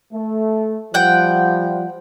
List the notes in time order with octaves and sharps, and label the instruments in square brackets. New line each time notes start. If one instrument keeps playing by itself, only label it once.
[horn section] A3
[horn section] F3 G3 [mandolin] F#5 G5